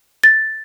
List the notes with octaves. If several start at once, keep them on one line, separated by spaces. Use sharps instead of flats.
A6